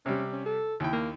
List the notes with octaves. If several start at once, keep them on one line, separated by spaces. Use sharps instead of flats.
C3 G3 C#4
C#4
A4
D#2 E4 G5
A#3